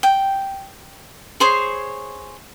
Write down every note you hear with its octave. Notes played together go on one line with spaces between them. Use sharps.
G5
G#4 C5 C#5